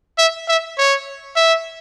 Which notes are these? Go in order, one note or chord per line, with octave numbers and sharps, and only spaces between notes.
E5
E5
C#5
E5